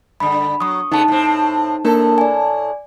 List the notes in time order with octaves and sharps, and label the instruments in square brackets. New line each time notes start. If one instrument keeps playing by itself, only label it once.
[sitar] G2 D3 [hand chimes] B5
[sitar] F#3 [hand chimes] C#6 D#6
[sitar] C#3 A3 B3 [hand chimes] D#4 A5
[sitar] A2 C4
[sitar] A2 A4 [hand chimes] A#3 D4 A#4
[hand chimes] D5 G#5